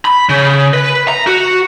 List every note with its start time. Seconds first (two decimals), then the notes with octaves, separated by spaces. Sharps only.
0.05 B5
0.29 C#3
0.74 B4
1.08 A#5
1.27 F#4